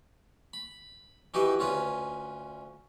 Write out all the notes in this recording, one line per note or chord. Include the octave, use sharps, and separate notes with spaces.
B5
E3 D#4 F#4 G4 B4
D2 C#4 F4 B4